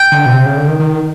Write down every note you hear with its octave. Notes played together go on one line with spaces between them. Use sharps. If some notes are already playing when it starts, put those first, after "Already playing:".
Already playing: G5
D3
B2
C3
C#3
D3
D#3
D#3